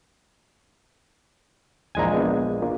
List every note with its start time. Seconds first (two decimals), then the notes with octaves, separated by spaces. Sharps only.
1.95 A#1 D#2 E3 G#3 G#5 A#5
2.14 B3 D4
2.62 A#3 D4 F4